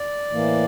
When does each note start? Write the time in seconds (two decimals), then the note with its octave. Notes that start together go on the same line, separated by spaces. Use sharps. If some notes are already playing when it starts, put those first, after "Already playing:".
Already playing: D5
0.30 A2 E3 A#3